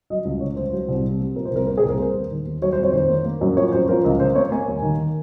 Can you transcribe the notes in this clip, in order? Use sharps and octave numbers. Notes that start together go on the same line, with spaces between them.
F#3 D#5
C#2
C#3 C#5
C#2 C5
F#3 C5
C2
C3
A#3
F3 A#4
C5
C2 A#4
A#2 A#4
G#4
C2
A#4
A#3 C5
D#2
D#3
D#2
F#3 C#5
C5
F2
C#5
D#3 C5
A#3
A#3
F#2
F3 C#5
F#2 C5
F3 A#4
C#2
C#3 C5
A#3 C#5
A#3 G#5
D#2
D#3